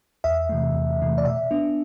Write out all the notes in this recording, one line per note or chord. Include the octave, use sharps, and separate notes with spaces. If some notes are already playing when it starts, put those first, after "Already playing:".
E2 E5
C3 E3 A3
E2
C3 E3 A3
D5
B2 E5
B3 D4